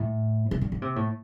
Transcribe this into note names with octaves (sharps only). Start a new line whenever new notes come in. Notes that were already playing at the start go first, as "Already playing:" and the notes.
Already playing: A2
C3
D3
D3
C3
A2